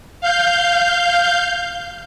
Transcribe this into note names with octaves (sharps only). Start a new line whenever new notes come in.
F5 G6